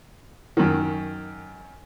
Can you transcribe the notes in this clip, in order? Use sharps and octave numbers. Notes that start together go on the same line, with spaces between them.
F#2 D#3